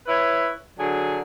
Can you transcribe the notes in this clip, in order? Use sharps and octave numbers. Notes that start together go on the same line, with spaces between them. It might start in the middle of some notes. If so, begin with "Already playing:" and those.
E4 B4 C#5
D3 F#3 G#4